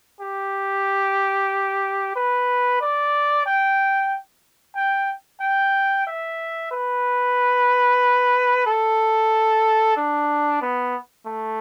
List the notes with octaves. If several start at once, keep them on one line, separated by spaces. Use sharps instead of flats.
G4
B4
D5
G5
G5
G5
E5
B4
A4
D4
B3
A3